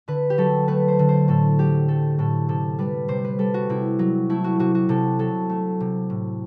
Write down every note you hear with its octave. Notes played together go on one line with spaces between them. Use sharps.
D3 B4
G4
F#3 A4
A3 B4
C5
D3
C5
A2 A4
F#3 G4
A3 A4
A2 A4
C3 A4
G3 B4
C3 C5
B4
G3 A4
F#4
C3 E4
F#3
A3 E4
F#4
C3 F#4
F#4
C3 A4
F#3 A4
A3
C3
A2